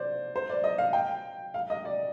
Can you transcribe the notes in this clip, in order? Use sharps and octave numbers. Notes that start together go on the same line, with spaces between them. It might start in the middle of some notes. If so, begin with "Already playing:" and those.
Already playing: C5 D5
C5
D5
D#5
F5
G5
F5
D#5
D5